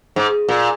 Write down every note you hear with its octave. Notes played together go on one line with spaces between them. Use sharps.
G#2
A#2